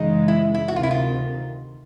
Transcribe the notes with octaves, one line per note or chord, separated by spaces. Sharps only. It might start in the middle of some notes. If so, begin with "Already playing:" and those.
Already playing: F#2 C#3 E3 G#3 D#4
E4
E4
D2 C3 D#3 F#4
F4
E4
F4